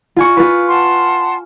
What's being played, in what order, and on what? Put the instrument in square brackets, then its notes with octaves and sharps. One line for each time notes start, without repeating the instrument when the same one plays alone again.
[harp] F4 G#5 C#6
F4 B4
[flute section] F#5 A5 C6